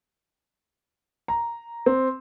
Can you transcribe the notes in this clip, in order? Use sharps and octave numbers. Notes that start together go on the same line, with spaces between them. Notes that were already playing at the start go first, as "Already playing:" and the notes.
A#5
C4